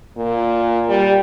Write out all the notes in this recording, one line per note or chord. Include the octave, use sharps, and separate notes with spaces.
A#2
G3